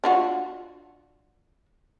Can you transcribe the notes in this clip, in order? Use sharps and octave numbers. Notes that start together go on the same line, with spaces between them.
D4 F4 F#4